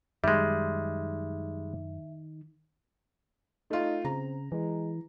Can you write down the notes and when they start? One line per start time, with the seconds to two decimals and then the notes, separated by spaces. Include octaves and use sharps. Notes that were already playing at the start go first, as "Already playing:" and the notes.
0.24 F#2 D#3 G3 G#3 D#4 E5
3.70 A3 D#4 F4
4.05 C#3 C4 A#5
4.52 E3 G#3